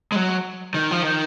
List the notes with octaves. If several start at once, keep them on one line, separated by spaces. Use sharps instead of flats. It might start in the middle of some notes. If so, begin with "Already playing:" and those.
G#3
F#3
D#3
F3
D#3